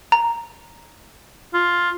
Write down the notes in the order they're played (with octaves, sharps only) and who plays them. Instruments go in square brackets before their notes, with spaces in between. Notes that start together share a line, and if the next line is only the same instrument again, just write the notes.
[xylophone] A#5
[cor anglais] F4